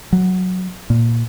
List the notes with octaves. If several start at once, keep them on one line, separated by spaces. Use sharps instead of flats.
F#3
A#2